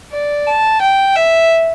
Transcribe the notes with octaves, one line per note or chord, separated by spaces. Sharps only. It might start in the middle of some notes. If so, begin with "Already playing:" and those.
D5
A5
G5
E5